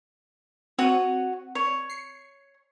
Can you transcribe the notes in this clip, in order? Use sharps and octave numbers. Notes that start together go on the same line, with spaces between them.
C4 F#4 C#5 D#7
C#5
C7 C#7